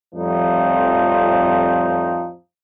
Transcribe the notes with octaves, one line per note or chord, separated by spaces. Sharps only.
F2 A2 F3 G3 C4 D#4